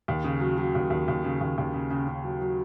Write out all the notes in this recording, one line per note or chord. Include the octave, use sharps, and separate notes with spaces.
D#2
C#3
F#3
F#3
D#2
D#2
D#2
C#3
D#2
D#2
C#3
C#3
C#3
F#3
F#3